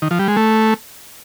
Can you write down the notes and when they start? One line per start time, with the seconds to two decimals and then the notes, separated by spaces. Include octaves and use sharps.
0.02 D#3
0.11 F3
0.19 G3
0.28 G#3
0.37 A3